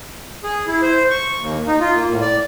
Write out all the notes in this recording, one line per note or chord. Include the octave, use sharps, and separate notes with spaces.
G#4
E4
C5
C#6
D#2
D#4
F4
A#3
A2
D5